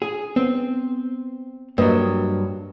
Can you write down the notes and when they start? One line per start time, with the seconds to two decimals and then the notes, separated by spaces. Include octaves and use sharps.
0.02 G#4
0.36 B3 C4
1.78 G2 F#3 A#3 B4 D#5